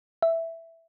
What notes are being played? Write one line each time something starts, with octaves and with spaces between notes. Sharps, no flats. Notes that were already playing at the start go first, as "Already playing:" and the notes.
E5